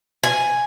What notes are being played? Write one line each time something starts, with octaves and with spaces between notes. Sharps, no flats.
G#5